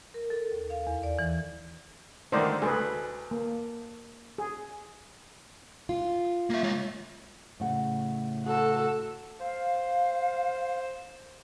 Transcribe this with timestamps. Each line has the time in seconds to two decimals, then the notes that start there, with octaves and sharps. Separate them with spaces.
0.14 A#4
0.30 A4
0.52 D#2
0.70 F5
0.87 E2
1.03 D5
1.19 E3
2.32 D3 D#3 A3 C5 D5
2.62 D2 G#4 A4 B4
3.31 A#3
4.38 G#4
5.89 F4
6.50 A#3 E5
6.63 G#3 C#5
7.60 A2 C#3 F#5
8.45 F#4 A4
9.40 C5 F5